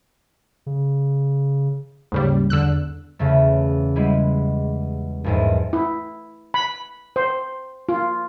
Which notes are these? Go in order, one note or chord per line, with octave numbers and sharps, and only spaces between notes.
C#3
D#2 G#2 C#3 G3
E2 D3 E6 F#6
E2 C#3 A3
G3 G#3 B3 E4
A#1 E2 G#2
E4
B5
C5
F4